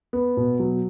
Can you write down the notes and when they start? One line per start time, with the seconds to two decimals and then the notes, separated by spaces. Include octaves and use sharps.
0.13 B3
0.37 B2
0.60 F#3